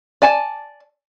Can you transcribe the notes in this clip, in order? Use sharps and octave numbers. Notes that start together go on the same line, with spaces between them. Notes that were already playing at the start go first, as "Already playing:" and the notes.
D5 G#5 A5